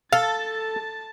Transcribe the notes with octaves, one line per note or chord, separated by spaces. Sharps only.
A4 F5 A5 A6